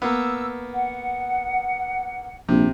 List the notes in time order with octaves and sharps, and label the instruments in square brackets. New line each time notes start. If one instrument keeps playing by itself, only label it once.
[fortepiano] A#3 B3 [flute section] E6
[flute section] F#5
[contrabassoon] A#1 [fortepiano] C3